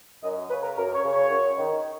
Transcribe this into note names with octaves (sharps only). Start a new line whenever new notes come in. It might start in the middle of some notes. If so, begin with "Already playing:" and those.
F#2 D#5
C#3 B4
A#4
F#2 A#4
C#5
C#3
C#5
F#2
D#3